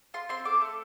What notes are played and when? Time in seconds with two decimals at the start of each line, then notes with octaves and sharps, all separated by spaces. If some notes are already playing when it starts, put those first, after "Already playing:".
0.14 F4 C6
0.29 C4 C6
0.45 A4 D6
0.61 A3